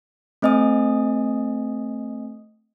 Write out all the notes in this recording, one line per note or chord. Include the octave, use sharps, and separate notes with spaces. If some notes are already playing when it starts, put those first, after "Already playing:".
A3 C4 D#5 G#5 D#6